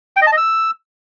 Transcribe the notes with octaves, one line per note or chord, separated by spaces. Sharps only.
G5
D#5
A5
D#5
E6